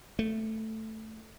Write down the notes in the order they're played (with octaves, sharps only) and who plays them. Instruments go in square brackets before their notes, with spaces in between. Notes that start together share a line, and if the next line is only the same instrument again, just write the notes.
[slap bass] A3